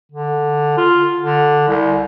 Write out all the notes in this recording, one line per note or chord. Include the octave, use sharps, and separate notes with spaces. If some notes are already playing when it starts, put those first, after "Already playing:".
D3
F4
D3
C2